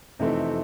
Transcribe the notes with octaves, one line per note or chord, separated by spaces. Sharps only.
F2 C3 E3 A3 C4 D#4